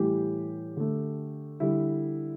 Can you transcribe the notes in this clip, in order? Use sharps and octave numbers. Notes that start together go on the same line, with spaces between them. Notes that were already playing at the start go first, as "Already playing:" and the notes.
Already playing: A2 E3 G3 G4
D3 A3
D3 G3 E4